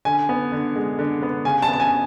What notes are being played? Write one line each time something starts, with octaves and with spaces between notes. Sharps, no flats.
D3 G#5
B3
D3
G#3
D3
B3
C#3 G#5
A5
B3
A5
G#5